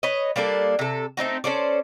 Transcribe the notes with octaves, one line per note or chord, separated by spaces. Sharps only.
B4 C#5 D#5
G3 A#3 D4 A4
C3 A4
A3 C4 D#4 F#4
C#4 A4 C5 D5